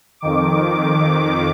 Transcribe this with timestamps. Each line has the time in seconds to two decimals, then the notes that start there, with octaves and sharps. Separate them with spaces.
0.20 F2 D#3 D6